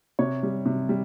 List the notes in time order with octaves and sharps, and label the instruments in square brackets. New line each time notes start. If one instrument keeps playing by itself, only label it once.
[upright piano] C3 C#5
G3
C3
G3